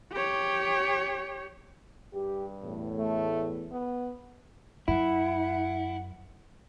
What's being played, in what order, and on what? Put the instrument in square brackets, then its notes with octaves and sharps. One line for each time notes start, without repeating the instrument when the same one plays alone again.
[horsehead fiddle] G4 C#5
[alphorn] G2 [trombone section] G4
[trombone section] E2 A2
[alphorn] A3
B3
[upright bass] F#2 [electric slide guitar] E4 [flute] F#5